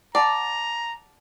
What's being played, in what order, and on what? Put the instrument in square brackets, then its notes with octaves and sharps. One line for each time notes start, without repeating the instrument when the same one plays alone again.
[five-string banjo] D5 [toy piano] F#5 A5 [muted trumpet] A#5